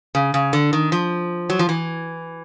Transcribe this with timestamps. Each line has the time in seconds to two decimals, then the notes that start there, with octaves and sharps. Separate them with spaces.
0.15 C#3
0.34 C#3
0.53 D3
0.73 D#3
0.92 F3
1.50 F#3
1.59 F3
1.69 E3